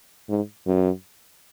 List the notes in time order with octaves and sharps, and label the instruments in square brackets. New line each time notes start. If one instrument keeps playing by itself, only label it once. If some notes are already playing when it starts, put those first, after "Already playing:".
[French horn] G#2
F#2